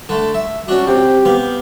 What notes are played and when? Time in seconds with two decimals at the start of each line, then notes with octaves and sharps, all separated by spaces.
0.09 D3 A3
0.34 E5
0.68 C#4 D4 F#4
0.88 C3 G4
1.25 B3 F5